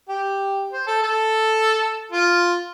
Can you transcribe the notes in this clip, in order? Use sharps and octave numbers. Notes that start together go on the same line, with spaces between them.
G4
C5
A4
A4
F4